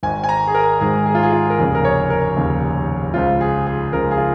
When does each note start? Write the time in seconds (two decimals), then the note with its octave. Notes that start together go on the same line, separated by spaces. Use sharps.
0.03 G#1 G#2 D#3 G#5
0.24 G#5
0.29 A#5
0.47 G#4
0.54 A#4
0.80 G#1 G#2 D#3 G#4
1.06 G#4
1.15 F4
1.23 G#4
1.32 F4
1.50 A#4
1.59 F1 D#2 C#3 G#4
1.75 A#4
1.84 C#5
2.10 A#4
2.36 F1 D#2 C#3
3.14 C#2 C#3 F3 F4
3.41 G#4
3.67 G#4
3.92 C#2 C#3 F3 A#4
4.11 G#4
4.18 F4